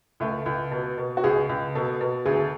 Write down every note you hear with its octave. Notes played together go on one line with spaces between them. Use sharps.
C#2 A3
C#2
B2
B2
F#4
C#2 G#4
C#2
B2 A4
B2
D2 G#4